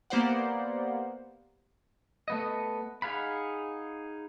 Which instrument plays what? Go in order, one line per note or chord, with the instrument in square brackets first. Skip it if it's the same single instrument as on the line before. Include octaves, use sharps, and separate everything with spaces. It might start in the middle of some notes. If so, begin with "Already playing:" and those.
[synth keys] A#3 B3 G4 C5 D5 F#5
[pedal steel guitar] A3 B3 D#5
D#4 G#4 F5 F#5 B5